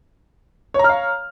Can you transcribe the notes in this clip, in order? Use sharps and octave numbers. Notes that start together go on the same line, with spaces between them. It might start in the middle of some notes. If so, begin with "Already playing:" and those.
C#5 F5 A#5 F6